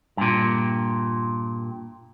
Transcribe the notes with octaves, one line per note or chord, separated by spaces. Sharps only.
G2 A#2